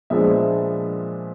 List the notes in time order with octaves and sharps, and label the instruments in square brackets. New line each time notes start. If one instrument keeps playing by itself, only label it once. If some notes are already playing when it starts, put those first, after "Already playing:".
[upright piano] A#2 F3 G#3 B3 D4 E5